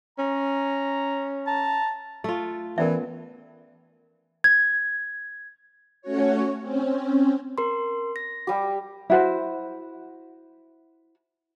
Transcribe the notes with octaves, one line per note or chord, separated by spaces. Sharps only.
C#4 A#5
A5 A#5
A3 F4
E3 B3 C#4 A#4 D5 E5
G#6
A3 C#4 F#4 C#5
C4 C#4
A#4 C6
A#6
G3 G4
E4 F#4 C5